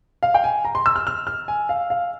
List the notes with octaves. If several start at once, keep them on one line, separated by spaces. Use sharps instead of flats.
F5
G5
G#5
A#5
C6
E6
F6
F6
F6
G#5
F5
F5